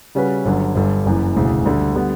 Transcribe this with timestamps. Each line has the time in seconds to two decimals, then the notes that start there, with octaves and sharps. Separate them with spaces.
0.15 C#3 G3 C#4 F#4 B4
0.45 G1 G2 D3 F#3
0.75 G1 G2 D3
1.05 F#1 F#2 E3
1.35 E1 D2 C#3 E3
1.65 D2 D3 G3
1.95 D3 G3 B3